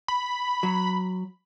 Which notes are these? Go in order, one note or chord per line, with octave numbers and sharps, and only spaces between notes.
B5
F#3